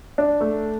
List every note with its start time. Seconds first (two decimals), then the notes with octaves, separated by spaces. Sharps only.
0.18 D4
0.41 A3